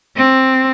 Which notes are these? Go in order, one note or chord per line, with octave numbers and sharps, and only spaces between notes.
C4